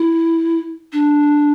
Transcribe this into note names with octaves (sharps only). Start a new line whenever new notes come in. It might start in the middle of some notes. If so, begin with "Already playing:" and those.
Already playing: E4
D4